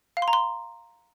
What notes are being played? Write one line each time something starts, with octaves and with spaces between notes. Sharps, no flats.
F5
C6
A#5
C6